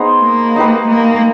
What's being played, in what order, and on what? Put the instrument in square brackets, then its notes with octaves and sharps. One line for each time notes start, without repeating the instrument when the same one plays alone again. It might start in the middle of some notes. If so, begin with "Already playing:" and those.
Already playing: [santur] B3 D#4 G#4 C5
[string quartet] A#3
[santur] D#4 G4 B4
[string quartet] A#3